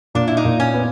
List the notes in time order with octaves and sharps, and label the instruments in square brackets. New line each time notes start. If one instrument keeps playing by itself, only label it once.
[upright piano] A#2 [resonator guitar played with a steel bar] D4
[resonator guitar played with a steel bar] E4
D#4
[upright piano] A#2
[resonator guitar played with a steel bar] C#4
[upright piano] B3